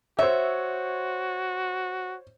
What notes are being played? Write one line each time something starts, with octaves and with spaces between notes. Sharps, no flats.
F#4 C5 C#5 E5